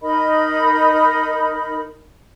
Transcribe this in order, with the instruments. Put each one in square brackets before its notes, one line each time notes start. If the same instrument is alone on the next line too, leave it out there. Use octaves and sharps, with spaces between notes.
[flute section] D#4 A#4 D#5 B5